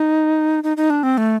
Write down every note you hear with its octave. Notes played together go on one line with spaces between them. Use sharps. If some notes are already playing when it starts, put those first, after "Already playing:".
Already playing: D#4
D#4
D#4
D4
C4
A3